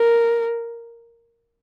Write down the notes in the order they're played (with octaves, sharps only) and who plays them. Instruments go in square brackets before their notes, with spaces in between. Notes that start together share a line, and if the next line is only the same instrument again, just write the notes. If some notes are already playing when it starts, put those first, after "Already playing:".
Already playing: [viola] A#4